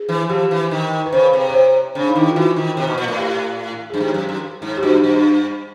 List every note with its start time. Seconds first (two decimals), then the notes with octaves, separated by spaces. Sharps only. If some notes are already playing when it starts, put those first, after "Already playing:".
Already playing: G#4
0.09 E3
0.29 F3 G4
0.51 E3
0.71 D#3
1.06 B4
1.12 C#3 C5
1.33 C3
1.49 C#5
1.54 C5
1.95 C#3 D4
2.09 D#4
2.15 D#3 E4
2.27 F4
2.36 E3 F#4
2.56 D#3
2.77 C3
2.87 B2
2.98 A#2
3.08 A2
3.18 G4
3.90 G2 G#4
4.00 G#2 G4
4.14 F#2
4.29 F#2
4.62 G#2
4.77 G4
4.83 G2 F#4
5.04 G2